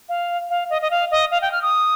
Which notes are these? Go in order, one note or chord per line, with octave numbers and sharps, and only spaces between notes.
F5
F5
D#5
D#5
F5
D#5
F5
G5
F6
D#6